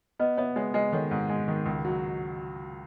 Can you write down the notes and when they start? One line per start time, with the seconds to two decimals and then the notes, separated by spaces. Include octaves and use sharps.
0.19 B3 B4 D#5
0.37 B3 C#5 E5
0.56 G#3 C#5 E5
0.74 G#3 B4 D#5
0.92 D#3 A4 C#5
1.11 G#2
1.30 G#3
1.48 D#3
1.66 C#2
1.85 F#3